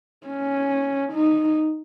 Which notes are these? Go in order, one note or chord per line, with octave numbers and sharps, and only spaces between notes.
C#4
D#4